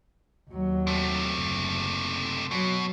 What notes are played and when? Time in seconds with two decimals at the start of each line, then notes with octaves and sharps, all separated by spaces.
0.50 D#2 F#3
0.87 C3 A3
1.35 F#1
2.51 B2 F#3